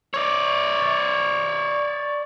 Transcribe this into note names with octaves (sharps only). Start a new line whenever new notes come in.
C#5 D5